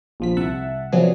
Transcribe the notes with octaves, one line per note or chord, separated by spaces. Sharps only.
A#1 F3 B6
C2 E5 F#5 A5
C3 F3 F#3 B3 D4 G#4